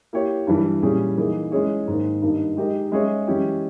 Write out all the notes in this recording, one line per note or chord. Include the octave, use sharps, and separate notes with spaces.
A#3 E4 G4 C#5
G2 E3 G3
A#2 G3 C#4 E4 G#4
E3 A#3 D#4 G#4
G#3 C#4 E4 G#4 C#5
G#2 D#3 A#3
G2 D#3 A#3 D#4
G#3 D#4 G4 A#4 D#5
G#3 C#4 G#4 C#5 E5
E3 G#3 C#4 E4 G4